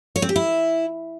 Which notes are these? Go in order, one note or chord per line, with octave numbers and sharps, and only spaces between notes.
C#5
C4
G4
E4